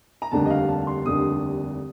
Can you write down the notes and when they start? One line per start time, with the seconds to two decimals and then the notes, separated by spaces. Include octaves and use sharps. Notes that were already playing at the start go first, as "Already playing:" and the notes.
0.22 A#5
0.31 F1 D#2 D3 G3 A5
0.46 D#5
0.50 F5
0.69 A5
0.87 C6
1.05 F1 D#2 D3 G3 D#6